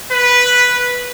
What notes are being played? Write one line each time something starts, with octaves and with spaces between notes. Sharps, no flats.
B4